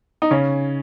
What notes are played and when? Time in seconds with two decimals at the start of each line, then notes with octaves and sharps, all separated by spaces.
0.22 D#4
0.31 C#3 C#4